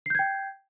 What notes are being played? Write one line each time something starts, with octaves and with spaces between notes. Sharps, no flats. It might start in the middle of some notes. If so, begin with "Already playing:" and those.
G5 G6 G#6 C7